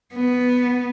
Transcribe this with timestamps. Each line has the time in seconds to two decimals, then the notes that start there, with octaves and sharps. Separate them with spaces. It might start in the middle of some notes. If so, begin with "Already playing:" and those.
0.14 B3